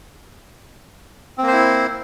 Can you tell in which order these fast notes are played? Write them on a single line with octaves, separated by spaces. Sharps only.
C4 A#3 C5 E4